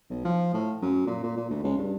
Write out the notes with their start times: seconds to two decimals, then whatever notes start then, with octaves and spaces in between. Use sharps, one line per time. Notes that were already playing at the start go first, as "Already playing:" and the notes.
0.10 B1
0.25 F3
0.54 A2
0.82 F#2
1.07 A#2
1.23 A#2
1.37 A#2
1.50 D2
1.64 C#2
1.78 G2